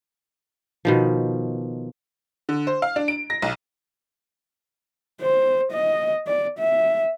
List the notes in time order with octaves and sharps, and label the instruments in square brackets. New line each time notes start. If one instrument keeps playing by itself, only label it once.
[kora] B2 D#3 F3
[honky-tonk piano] D3
C5
F5
D4
D7
A#6
B1
[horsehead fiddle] C5
D#5
D5
E5